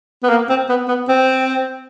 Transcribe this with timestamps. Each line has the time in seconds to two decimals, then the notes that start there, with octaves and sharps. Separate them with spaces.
0.23 B3
0.29 A#3
0.49 C4
0.69 B3
0.88 B3
1.08 C4